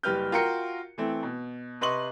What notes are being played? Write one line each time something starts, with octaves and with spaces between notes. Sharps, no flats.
F#1 G3 G4 B4 F6 G6
F4 F#4 A#4 G5 C#7
E3 A3 C4
B2
C3 B4 D#5 C6 C#6 F#7